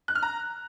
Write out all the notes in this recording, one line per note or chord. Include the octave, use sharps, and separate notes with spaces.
F#6
F6
A#5